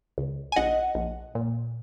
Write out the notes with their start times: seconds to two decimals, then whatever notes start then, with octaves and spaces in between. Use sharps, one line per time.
0.18 C#2
0.52 G#5
0.56 A#1 D#5 F#5
0.95 A#1
1.35 A#2